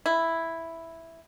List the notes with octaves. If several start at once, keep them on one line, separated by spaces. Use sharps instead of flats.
E4